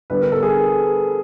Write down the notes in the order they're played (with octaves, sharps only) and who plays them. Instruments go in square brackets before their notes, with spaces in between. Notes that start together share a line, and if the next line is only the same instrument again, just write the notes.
[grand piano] D3 G3 B3 B4
A#4
A4
G#4 A#4